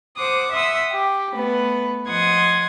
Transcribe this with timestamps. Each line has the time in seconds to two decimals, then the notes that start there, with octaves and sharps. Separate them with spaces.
0.17 C5 F#5 D6 D#6
0.53 E5 F#5 C6 D#6 E6
0.92 G4
1.34 A3 B3 B4
2.08 F3 D#5 F#5 C6 D#6 G#6